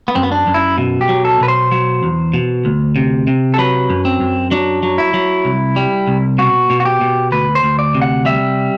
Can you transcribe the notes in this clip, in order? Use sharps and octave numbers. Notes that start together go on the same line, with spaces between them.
B3
F#2 C4
B3
D4
F#2
E4
B2
G4
F#3
A4
B2 B4
C5
F#3
E2
B2
D2
C3
C3
A4
F#3 B4
F#2
C4
F#2
F#3 D4
F#3
E4
F#3
C2
G3
C2
B2 F#4
B2
F#4
G4
B2
D2 B4
C5
D2
D5
C3
F#5
G3 E5